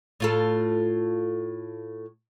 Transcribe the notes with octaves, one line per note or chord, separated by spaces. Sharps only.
A2 F4 A4